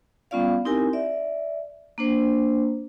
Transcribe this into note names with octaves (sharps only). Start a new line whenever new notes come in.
G3 B3 C#4 F4 D5 F5
C4 D#4 E4 G4 A#4 G#5
D5 E5
A#3 D4 C5